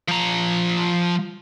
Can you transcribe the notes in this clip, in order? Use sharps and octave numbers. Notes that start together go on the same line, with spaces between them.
F3 A#5